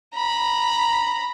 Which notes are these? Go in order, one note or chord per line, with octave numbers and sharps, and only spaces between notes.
A#5 B5